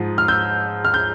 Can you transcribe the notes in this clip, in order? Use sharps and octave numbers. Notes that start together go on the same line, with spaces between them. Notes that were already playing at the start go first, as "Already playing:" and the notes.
Already playing: G#2 F3
F6
E6 G6
F6
G6